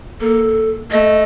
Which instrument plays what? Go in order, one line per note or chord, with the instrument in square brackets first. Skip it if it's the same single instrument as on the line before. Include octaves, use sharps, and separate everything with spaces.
[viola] A#3 [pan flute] A4
[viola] A3 [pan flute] D#5